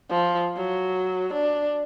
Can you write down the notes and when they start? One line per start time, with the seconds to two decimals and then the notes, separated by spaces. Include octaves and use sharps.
0.10 F3
0.57 F#3
1.34 D4